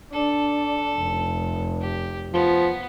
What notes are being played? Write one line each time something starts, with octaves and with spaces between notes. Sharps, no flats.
D4 A4
F1
G4
F3 B3